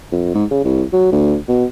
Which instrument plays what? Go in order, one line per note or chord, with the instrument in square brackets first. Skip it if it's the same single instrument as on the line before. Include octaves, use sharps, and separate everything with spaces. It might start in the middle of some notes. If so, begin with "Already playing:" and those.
[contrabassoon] F2
G#2
C#3
C2
F#3
D2
B2